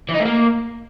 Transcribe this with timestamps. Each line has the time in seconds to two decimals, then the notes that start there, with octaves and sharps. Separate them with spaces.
0.09 E3
0.14 D#4
0.20 A3
0.25 A#3